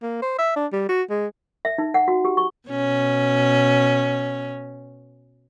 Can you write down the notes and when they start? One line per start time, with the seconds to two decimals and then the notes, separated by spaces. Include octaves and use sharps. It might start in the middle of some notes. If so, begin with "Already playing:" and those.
0.03 A#3
0.22 C5
0.39 E5
0.56 D4
0.73 G3
0.89 F#4
1.10 G#3
1.65 E5
1.78 D#4
1.94 F#5
2.08 F#4
2.25 G4
2.37 C#6
2.69 B2 C#4